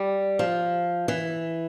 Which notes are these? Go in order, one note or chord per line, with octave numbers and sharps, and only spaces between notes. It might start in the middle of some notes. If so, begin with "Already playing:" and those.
Already playing: G3
F3
E3